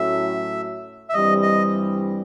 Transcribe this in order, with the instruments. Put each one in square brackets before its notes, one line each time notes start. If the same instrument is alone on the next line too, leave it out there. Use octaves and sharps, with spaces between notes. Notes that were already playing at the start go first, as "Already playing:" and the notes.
Already playing: [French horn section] A2 F#3 A3 C#4 F#4 [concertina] E5
[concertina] E5
[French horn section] G2 E3 G3 C4 [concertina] D#5
[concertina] D#5